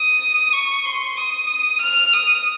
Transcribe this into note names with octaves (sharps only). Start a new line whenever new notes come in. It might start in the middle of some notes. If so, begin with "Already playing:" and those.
Already playing: D#6
C#6
C6
D#6
F6
D#6